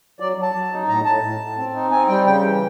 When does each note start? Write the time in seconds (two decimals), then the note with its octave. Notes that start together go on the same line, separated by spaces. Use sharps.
0.20 F#3 D5
0.37 F#3
0.42 A5
0.55 F#3
0.72 D#4
0.88 A2 A#5
1.05 A2 A5
1.23 A2
1.41 A2
1.58 C4
1.74 D#4
1.91 C4 G#5
2.08 G3 G5
2.25 C#3 G5
2.43 E3